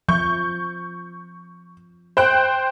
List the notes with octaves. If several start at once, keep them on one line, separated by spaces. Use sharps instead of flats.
F3 C#6 G6
C5 G5 F#6